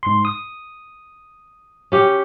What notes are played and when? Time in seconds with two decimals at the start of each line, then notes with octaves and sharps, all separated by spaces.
0.03 G#2 C6
0.25 D#6
1.92 C#4 G4